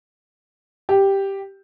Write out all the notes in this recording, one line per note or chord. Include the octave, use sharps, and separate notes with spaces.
G4